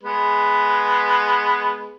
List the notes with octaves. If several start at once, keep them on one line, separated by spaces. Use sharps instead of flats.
G#3 B3 B4